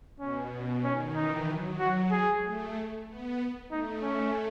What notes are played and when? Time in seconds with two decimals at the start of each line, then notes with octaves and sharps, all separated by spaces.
0.19 B2 C#4
0.84 D#3 C#4
1.15 E3 D#4
1.48 F#3
1.79 F#4
2.11 G#3 G#4
2.44 A3
3.07 B3
3.71 A3 D#4
4.03 C#4